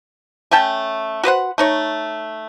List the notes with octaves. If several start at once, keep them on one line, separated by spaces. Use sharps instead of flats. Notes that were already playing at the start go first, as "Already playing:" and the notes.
A3 C#4 G5 A5
F#4 B4 C5 F#5
A3 D#4 C#5